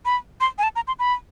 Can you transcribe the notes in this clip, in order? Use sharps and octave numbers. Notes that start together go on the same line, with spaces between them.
B5
C6
G#5
A5
A#5
C6
B5